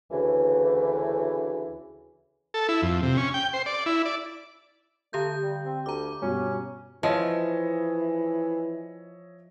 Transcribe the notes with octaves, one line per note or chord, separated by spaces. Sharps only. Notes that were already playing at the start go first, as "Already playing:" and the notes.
D2 C#3 E3
A4
E4
F2
C3
C#4
G5
C5
D5
E4
D5
D3 A3 G4 G6
G3
C4
D2 A#5 D6
G2 B2 C#4 G4
E3 F3 C#5 D#5 E5